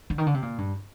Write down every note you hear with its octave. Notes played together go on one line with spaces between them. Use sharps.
D3
D#3
D3
C3
A#2
G2